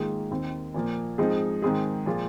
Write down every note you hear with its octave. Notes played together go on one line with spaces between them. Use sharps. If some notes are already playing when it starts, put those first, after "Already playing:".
Already playing: G#2 D#3 A#3 F4 G#4
D#2 D#3 C4
A#2 F3 A#3
G#2 F3 C4 D#4 G#4
G#2 D#3 G#3 C4 G#4
A#2 F3 G#3 F4